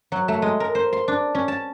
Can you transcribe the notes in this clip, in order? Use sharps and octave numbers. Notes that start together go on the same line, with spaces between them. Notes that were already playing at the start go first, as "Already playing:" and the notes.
F#3
A3
G#3
A#4
C5
C6
D4
C#4
A5